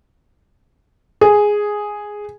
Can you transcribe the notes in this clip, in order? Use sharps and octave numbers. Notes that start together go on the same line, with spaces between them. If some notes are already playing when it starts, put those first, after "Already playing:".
G#4